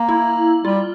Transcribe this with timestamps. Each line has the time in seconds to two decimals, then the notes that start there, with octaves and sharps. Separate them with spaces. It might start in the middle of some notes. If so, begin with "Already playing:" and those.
Already playing: A#3
0.09 E4
0.64 G3 F4